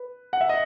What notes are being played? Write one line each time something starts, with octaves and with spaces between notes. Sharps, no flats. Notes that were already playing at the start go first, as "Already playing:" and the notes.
Already playing: B4
F#5
E5
D#5